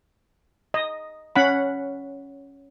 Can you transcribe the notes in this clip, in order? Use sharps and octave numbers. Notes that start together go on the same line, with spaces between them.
D#5
C#4 F#5 B5